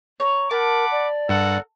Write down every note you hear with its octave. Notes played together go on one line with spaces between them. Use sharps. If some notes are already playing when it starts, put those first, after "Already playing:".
C#5 A#5
A#4 F#5 A5 B5 D6
D5
G2 A4 A#4 F#5